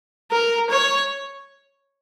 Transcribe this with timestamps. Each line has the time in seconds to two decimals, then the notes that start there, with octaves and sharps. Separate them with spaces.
0.31 A#4
0.70 C#5